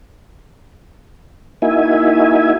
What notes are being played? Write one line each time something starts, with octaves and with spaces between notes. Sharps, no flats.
A#3 D#4 E4 F#4 E5 G#5